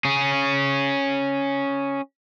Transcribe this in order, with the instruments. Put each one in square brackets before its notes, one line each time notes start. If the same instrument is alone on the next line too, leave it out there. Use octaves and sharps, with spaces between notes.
[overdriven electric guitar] C#4 G#4